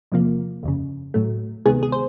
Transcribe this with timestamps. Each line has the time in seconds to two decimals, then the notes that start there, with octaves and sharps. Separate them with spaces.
0.12 E2 C3 F3 A#3
0.63 G1 F2 C#3
1.14 A2 F#3 A3
1.65 D2 C3 D#3 G#3 B3 G#4
1.83 G#4
1.92 C5